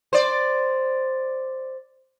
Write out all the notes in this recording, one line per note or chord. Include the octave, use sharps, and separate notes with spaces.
C5 D5